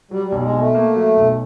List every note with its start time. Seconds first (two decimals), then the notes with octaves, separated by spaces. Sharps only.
0.11 F#3 G3
0.27 G3
0.32 B1
0.39 G3
0.43 G#3
0.53 B2
0.59 A3
0.75 A#3
0.95 F#3
1.17 B1